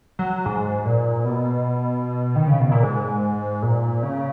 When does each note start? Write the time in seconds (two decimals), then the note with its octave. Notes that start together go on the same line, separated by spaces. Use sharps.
0.19 F#3
0.46 G#2
0.86 A#2
1.25 B2
2.36 D#3
2.48 C#3
2.60 B2
2.72 A#2
2.83 G#2
3.62 A#2
4.03 C#3